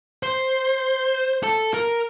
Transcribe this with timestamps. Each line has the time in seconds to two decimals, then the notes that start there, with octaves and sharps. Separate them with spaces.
0.23 C5
1.43 A4
1.74 A#4